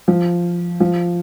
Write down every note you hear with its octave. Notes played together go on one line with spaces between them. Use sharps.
F3
F3